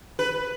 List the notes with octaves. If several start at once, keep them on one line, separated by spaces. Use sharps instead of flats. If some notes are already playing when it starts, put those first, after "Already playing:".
B4